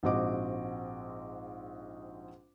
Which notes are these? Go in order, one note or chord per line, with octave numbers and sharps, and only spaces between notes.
A#1 G#2 C4 F#4 D#5 D6